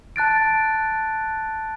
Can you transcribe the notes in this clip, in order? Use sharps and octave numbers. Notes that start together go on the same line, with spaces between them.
A5 F#6 A6 D7